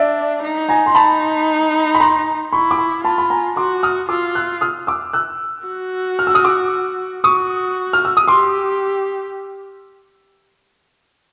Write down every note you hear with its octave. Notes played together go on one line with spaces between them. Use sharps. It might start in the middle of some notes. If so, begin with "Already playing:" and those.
Already playing: D4 D5 E5
D#4
G#5 A#5
C6
D#4 A5 B5
B5
A#5 C6
E4 B5 C#6
D6
B5 C#6
F4 A5 B5
B5
G#5 A#5
F#4 C6 D6
D#6 F6
F4 D6 E6
E6 F#6
D#6 F6
D6 E6
E6 F#6
F#4
F6
E6
D#6 F6
D6 E6
F#4 C#6 D#6
F6
E6
D#6
G4 C6 D6